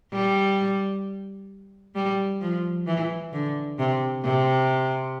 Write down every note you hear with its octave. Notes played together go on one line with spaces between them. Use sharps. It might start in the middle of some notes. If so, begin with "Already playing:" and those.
G3
G3
F3
E3
D3
C3
C3